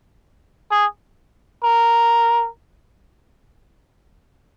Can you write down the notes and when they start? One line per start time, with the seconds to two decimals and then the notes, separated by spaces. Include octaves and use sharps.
0.71 G#4
1.64 A#4